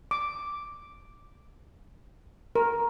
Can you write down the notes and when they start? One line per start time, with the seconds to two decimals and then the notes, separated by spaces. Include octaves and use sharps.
0.11 D6
2.56 A#4